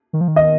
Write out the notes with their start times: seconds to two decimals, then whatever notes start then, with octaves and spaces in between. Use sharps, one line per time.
0.13 D#3
0.21 F3
0.28 D#3
0.36 D#5